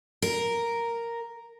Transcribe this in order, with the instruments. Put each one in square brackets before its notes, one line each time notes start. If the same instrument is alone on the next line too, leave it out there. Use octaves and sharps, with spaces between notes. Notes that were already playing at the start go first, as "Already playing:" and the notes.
[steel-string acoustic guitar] A#4